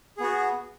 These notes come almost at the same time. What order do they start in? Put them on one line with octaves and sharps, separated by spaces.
G#4 B3 F#4